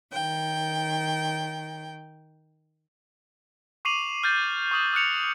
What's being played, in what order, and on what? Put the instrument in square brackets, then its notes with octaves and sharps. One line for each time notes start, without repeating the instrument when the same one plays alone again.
[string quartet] D#3 G5
[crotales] C#6 D6 C7 D#7 F7 F#7
F6 G6 A6
C#6 D#6 F#7
D#6 F6 F#6 C#7 F7